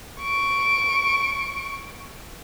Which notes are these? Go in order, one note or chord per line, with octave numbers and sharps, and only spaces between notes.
C#6 D7